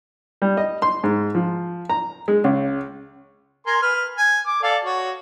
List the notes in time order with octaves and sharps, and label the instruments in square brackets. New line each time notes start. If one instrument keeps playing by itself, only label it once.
[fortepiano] G3
D#5
C6
G#2
F3
A#5
G#3
C#2
[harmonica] A#4 G#5 C6
B4 F6
G#5
D6
A4 D5 F5
F#4 C#5